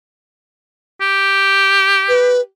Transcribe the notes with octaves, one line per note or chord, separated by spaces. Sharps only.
G4
B4